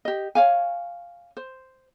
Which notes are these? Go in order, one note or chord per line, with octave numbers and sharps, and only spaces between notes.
G4 D#5
C#5 F5 G#5
C5